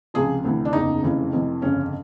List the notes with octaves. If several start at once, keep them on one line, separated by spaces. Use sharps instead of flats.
C#2 C3 F3 G#4
D2 C3 E3
D4
F#1 E2 C#3 D#4
F1 F2 C#3 E3
F2 C3 E3
G1 F2 C#3 C#4